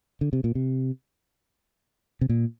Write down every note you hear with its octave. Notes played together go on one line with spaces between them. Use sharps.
D3
C3
A#2
C3
C3
A#2